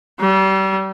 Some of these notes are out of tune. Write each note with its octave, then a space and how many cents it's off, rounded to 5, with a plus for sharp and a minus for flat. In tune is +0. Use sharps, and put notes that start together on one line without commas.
G3 -35